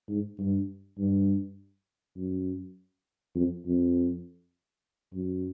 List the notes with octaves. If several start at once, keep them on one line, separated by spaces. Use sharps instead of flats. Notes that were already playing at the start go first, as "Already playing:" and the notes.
G#2
G2
G2
F#2
F2
F2
F#2